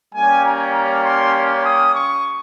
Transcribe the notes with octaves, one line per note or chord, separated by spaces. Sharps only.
G3 A#3 C#4 G4 G#5
A#5
A#5
C6
C6
D#6
C#6